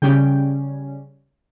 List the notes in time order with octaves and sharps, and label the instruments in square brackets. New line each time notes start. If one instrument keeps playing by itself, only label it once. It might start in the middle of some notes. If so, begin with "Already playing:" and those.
[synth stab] C#3 G3 C#4 G5